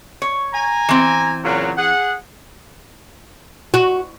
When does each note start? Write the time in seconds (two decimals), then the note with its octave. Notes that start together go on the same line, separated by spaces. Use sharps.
0.22 C#5
0.52 G#5 A#5
0.89 E3 C4
1.44 A#2 C#3 F#3
1.76 G#4 F#5
3.74 F#4